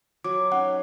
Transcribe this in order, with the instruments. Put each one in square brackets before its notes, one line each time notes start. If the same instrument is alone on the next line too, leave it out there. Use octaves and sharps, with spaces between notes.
[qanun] F#3 [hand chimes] D6
[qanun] C#4 D#4 [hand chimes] F#5